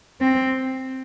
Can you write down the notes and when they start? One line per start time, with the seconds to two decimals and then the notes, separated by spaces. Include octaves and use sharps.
0.21 C4